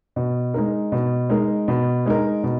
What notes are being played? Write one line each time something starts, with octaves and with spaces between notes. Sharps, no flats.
B2
G#3 D#4 A#4
B2
G#3 D#4 A#4
B2
G#3 D#4 A#4
B2